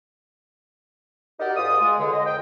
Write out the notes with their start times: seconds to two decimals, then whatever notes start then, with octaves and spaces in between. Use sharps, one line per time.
1.40 D#4 F#4 G4 A#4 D5
1.56 G#2 F4 D#6
1.81 G#3
1.98 C#2 D3
2.13 D#5
2.25 F2 G5